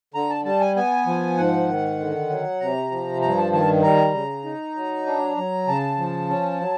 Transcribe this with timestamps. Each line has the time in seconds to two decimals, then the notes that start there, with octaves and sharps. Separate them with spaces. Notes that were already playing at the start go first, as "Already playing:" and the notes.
0.14 D3 A#5
0.30 A5
0.45 G3 A5
0.61 G#5
0.76 B3 G#5
1.07 F3
1.37 G#2 F#5
1.69 D#3
1.99 D3
2.30 F#3
2.60 C3 A#5
2.91 F3
3.22 G2 A#5
3.37 A5
3.52 D#3 A5
3.83 G3 A#5
4.14 C#3
4.45 D#4
4.75 F#3
5.06 D4
5.37 F#3
5.68 C#3 A5
5.99 F3
6.30 C#4
6.60 F#3